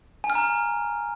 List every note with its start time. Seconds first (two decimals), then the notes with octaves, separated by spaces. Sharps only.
0.24 G#5
0.30 F6
0.35 A#5